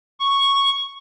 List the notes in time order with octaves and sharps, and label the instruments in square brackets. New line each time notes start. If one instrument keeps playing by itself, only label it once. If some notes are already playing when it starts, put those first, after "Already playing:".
[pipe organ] C#6